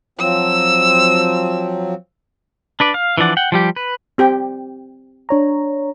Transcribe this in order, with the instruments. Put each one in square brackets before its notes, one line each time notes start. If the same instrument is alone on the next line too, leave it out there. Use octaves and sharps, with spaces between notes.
[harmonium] F3 F#3 C4 [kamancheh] E6
[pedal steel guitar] D4 B4 D5
F5
E3 F3 D4 D5 F#5
F#5 G5
F3 G3 G4
B4
[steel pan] C4 G4 G5
[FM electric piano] D4 C#5 A#5